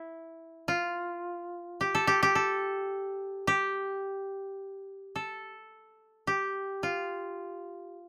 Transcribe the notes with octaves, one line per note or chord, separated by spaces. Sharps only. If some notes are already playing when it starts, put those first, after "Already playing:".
Already playing: E4
F4
G4
A4
G4
G4
A4
G4
A4
G4
F4